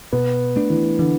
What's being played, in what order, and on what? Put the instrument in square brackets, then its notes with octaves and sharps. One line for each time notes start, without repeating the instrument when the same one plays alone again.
[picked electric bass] B2 [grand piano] B3
[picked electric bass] A3 D4
[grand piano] E3
[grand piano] D3 [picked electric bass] E3